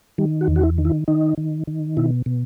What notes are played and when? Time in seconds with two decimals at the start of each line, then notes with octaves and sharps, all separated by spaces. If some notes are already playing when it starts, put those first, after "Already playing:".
0.18 D#3 G3
0.41 F#4
0.48 E2
0.56 F#4
0.63 E4
0.78 D#3
0.85 E4
1.08 D#3 D#4
1.37 D#3
1.67 D#3
1.97 B2 E4
2.26 B2